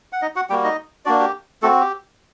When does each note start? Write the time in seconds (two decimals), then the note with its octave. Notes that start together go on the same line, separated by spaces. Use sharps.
0.13 F#5
0.22 D#4 D#5
0.36 F#4 F#5
0.50 G3 A#3 F#4 G4 G5
0.64 D#4 D#5
1.05 A#3 D4 F#4 D5
1.20 G4
1.62 A3 C4 F#4 A4
1.81 G4